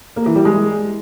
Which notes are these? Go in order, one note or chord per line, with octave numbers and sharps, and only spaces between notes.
A#3
E3
G3
G#3